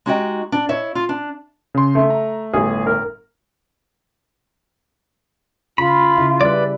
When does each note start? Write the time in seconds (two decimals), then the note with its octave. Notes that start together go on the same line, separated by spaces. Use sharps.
0.06 G#3 D#4 F#4 G4 D#5 G5
0.52 D4
0.69 E4 C#5 D#5 E5
0.95 F4
1.09 D4
1.74 C#3 C6
1.95 A3
2.10 A#5
2.53 G1 A2 G#4
2.86 A#4
5.78 C#3 F4 B5
6.17 C#3 E4
6.41 G3 B4 D5